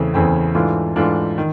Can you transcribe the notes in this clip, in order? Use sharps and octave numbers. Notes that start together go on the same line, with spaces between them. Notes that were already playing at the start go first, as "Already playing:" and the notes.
Already playing: E2 C#3 E3 A3 C4
E2 C#3 E3 A3 C4
G#2 E3 A3 D4 F4
G#2 E3 A3 D4 F4
D#3